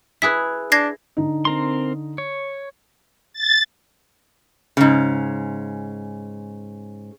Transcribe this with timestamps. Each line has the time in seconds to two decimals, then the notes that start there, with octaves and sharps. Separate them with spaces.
0.22 E4 G#4 B4 B6
0.72 D4 G#6 A#6 C7
1.17 D3 D#4
1.45 C4 A#4 C6
2.18 C#5
3.33 A6
4.77 G#2 C#3